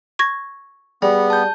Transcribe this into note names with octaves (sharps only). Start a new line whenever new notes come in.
C#6 G#6 A#6
G3 B3 G#4
A5 G6